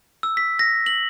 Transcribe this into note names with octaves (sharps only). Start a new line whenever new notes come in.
E6
B6
A#6
F#7